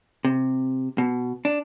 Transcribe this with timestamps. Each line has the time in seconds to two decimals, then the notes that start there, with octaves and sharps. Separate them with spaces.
0.25 C3
0.98 B2
1.45 D4